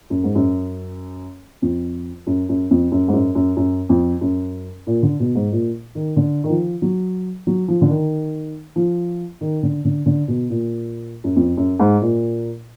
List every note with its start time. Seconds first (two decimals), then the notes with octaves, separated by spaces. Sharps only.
0.10 F#2
0.24 G#2
0.35 F#2
1.62 F2
2.27 F#2
2.49 F#2
2.71 F2
2.92 F#2
3.08 G#2
3.13 F#2
3.35 F#2
3.57 F#2
3.89 F2
4.21 F#2
4.87 A#2
5.03 D3
5.20 B2
5.35 G#2
5.52 A#2
5.95 D#3
6.16 D3
6.44 D#3
6.49 F3
6.82 F#3
7.47 F#3
7.68 F3
7.81 D3
7.89 D#3
8.76 F3
9.41 D#3
9.63 D3
9.85 D3
10.06 D3
10.28 B2
10.50 A#2
11.24 F#2
11.36 F2
11.57 F#2
11.80 G#2
12.01 A#2